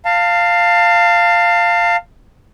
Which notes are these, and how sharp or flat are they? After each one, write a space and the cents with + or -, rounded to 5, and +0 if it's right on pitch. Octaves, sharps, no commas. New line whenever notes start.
F5 +0 A5 +30